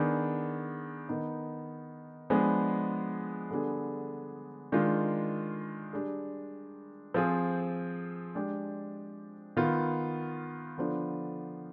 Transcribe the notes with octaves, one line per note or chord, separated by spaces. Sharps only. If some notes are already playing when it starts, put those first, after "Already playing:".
Already playing: D#3 B3 D4 G#4
D#3 B3 D#4
F3 G#3 B3 D4 G#4
D3 G3 B3 D4 G#4
D#3 G#3 D4 F4
G3 D4 G#4
F3 C4 F4 G#4
G#3 D4 G4
D#3 B3 F4
D3 F3 B3 D4 F4